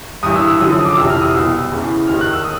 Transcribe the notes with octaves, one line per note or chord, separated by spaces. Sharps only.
G2 E3 D#6
E6
E6
F#2 D3 F3 D#6
D#6
D6
F2 C3 E3 E6
F6
D#6
C2 B2 E6
E2 C#3 E3
D#2 D#3 F6
F#6
E6
D#6